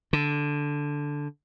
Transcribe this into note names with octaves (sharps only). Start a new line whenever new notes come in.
D3